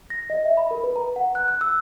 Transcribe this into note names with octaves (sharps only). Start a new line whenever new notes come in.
A#6
D#5
E5
B5
A#4
B4
A#5
F#5
F#6
F#6
E6